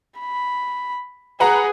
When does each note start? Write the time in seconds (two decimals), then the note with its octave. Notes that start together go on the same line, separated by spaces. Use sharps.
0.20 B5
1.40 G#4 B4 F#5 A#5